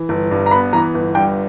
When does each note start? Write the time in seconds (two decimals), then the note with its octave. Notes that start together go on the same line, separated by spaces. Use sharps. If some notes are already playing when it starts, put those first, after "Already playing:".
Already playing: E3
0.09 G1
0.31 G2
0.46 A#5
0.51 B3 B5
0.73 E3 A#5
0.94 G1
1.15 G2 G5